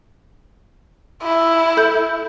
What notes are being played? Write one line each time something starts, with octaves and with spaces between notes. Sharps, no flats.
E4
A4 G6